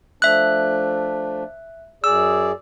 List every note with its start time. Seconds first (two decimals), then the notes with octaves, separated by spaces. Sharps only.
0.22 F3 A3 D4 E5 F#6
2.04 F#2 G#4 D5 E6